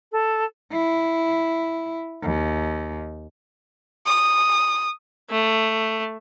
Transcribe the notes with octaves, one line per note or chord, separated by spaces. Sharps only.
A4
E4
D#2
D#6
A3